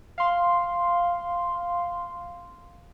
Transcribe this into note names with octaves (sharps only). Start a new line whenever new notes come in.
F5 C6